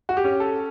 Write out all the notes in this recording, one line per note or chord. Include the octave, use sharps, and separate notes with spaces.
F#4
G4
C#4
A4